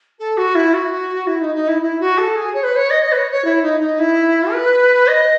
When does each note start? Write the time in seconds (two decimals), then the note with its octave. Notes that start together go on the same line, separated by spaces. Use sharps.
0.19 A4
0.37 F#4
0.55 E4
0.73 F#4
1.26 E4
1.41 D#4
1.55 D#4
1.67 E4
1.81 E4
2.00 F#4
2.17 A4
2.35 G#4
2.53 C#5
2.63 B4
2.76 C#5
2.90 D#5
3.03 D#5
3.12 B4
3.17 C#5
3.30 C#5
3.44 E4
3.62 D#4
3.79 D#4
3.99 E4
4.52 B4
5.07 D#5